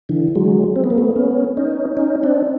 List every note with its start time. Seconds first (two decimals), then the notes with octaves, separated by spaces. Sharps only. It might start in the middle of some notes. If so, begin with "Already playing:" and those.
0.09 D3 E3
0.36 F#3 G#3
0.76 C4
0.84 B3
0.90 A#3
0.98 A3 B3
1.16 B3 C#4
1.57 C#4 D#4
1.97 C#4 D#4
2.23 C4 D4